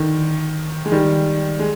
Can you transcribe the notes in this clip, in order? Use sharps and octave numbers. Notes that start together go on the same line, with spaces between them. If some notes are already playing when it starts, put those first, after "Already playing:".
Already playing: D3 D#3
G#3
D#3 G3
G#3